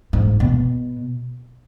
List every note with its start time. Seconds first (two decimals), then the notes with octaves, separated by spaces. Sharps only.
0.13 G#2
0.40 B2